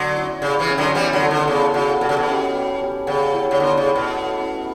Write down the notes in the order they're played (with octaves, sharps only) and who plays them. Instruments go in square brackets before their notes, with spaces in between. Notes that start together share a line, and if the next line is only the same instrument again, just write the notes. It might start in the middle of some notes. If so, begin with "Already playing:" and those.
Already playing: [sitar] D3 F#3 [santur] B3
[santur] C#4 E4
[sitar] C#3 [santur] G3
[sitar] C#3 E3
[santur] C#4 E4
[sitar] D3 F#3
[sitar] E3 G3 [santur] B3
[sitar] D3 F#3
[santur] F#4 A4
[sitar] D3
[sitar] C#3 [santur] B3
[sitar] C#3 [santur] F#4 A4
[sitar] B2 [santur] G3
[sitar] C#3
B2
[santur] C#4 G4
G3
C#4 G4
[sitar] C#3 [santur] B3
[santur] E4 G4 C#5
[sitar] C#3
[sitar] D3 [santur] B3
[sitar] C#3
[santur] E4 G4 C#5
[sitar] B2
[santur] A3
C#4 E4